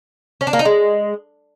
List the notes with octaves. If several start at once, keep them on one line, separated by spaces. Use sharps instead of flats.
C#4
D4
A#3
D#4
G#3